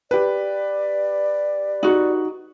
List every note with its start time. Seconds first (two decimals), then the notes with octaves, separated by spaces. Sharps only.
0.11 G4 B4 D5
1.83 D#4 F#4